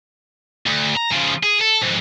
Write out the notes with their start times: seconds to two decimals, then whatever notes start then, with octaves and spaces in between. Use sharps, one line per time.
0.67 D2
0.97 A#5
1.12 C#3 F3
1.43 G#4
1.61 A4
1.81 F2 G#2